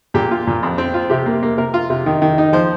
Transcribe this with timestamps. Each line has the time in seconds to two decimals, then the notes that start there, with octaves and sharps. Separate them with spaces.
0.14 A#2 G4
0.31 F4
0.47 A#2
0.63 F2
0.78 C4
0.94 F4
1.10 C3 G4
1.26 A#3
1.43 A#3
1.58 C3 A#4
1.74 F4
1.90 C3
2.06 D#3
2.22 D#3
2.38 D#4
2.53 F3 C5